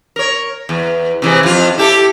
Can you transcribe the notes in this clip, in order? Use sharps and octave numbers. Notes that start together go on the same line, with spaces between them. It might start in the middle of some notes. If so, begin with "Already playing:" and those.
A#4 C#5
E2
C3 E3 G#3
F2 F4
E4 G4 A4